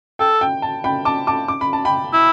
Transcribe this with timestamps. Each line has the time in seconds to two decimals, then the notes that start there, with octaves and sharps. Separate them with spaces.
0.19 A4 G5
0.41 G5
0.62 A5
0.84 G5 B5
1.05 A5 D6
1.27 A5 D6
1.48 D6
1.61 B5
1.73 A5
1.85 G5 B5
2.13 E4